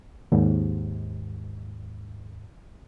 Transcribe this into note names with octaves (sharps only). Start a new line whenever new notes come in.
D#2 G#2